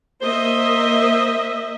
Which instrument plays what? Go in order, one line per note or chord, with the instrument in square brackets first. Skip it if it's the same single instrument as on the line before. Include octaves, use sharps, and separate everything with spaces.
[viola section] A#3 D#5 E5 [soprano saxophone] C5